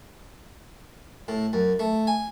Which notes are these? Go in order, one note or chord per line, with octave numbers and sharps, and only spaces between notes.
A2
F#2
A3
G#5